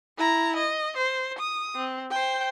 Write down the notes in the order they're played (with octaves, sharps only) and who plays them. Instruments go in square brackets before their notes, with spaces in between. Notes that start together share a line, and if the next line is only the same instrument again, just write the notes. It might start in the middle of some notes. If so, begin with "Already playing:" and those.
[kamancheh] E4 A#5
D#5
C5
D#6
C4
C5 G5